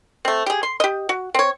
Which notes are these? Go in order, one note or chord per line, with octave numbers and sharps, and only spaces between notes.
A3 C4
G4 G#4
C6
G4 D#5
F#4
C4 C#5